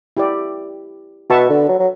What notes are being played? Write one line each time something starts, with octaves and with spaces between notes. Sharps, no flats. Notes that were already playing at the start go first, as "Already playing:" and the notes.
E4 G4 D5
B2 F#4 B4 E5 A5 C#6
D3
F#3
F#3